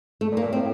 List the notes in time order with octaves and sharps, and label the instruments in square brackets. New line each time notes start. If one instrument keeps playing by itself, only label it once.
[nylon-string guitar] A3
[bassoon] A#2
[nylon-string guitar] A#3
[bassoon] A#2
[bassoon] A2 [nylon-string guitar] C4